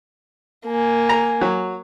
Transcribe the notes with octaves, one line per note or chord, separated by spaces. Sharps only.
A#3 G#5
A#5
F#3